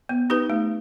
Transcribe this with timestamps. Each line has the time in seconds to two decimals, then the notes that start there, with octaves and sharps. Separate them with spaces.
0.09 B3
0.30 D#4 G4 B4
0.50 A3